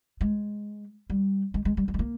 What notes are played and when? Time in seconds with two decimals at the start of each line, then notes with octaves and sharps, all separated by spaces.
0.21 G#3
1.10 G3
1.54 G#3
1.65 G#3
1.77 G3
1.88 G3
1.94 G#3
1.99 A#3